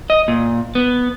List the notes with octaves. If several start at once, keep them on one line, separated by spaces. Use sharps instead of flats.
D#5
A#2
B3